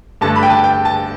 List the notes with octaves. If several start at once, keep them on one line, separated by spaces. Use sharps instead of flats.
G2 D3 A3 A5
B5
G5
A5
G5
A5